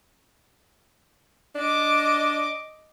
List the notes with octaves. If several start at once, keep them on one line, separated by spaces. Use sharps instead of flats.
D4 D#5 D6